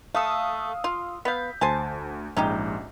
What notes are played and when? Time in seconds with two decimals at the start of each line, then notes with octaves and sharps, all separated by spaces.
0.15 A3 A4 F5 D#6 E6
0.84 F4
1.25 B3 F5 G6 B6
1.61 D2 C5 G#5 A5
2.37 A#1 G#2 C#4 D#4 G4